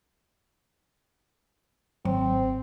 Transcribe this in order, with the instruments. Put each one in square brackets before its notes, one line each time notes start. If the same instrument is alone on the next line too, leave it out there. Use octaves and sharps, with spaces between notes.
[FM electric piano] G#1 [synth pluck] F#3 [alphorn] C4